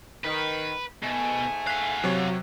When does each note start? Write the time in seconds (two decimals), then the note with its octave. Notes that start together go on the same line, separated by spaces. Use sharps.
0.25 D#3 B4
1.03 G#2 B2 A3 G#5
1.67 F#4 F5 F#6 B6
2.04 C3 F#3 C#5